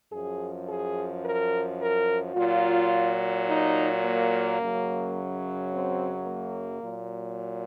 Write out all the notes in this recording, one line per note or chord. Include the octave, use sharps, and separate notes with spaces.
F#2 F3 G#4
G#4
A#4
A#4
A#2 F#3 F4
D#4
A#3
F#2 C#3 F#3
C4
A#3
A#2 F#3